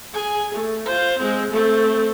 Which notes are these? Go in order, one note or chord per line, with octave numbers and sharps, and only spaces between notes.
G#4 G#5
A3
F4 C5
G#3 C4
A3 C4